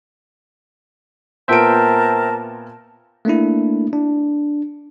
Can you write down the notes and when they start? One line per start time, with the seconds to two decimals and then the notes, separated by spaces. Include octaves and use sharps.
1.48 A#2 B3 A#4 C5 E5 G5 A5 D7
3.25 A3 A#3 D4 E4
3.93 D4